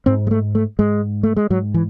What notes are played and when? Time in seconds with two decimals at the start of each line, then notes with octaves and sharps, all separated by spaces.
0.06 G#2 C4
0.27 G#3
0.31 A3
0.55 A3
0.79 G#2 G#3
1.23 A3
1.36 G#3
1.50 G#2 F#3
1.74 E3